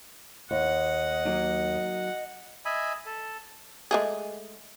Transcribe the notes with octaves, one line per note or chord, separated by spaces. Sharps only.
D#2 D#5 F#5
F#3 A#3 D#4
D#5 E5 G#5 B5
A4
G#3 A3 G#4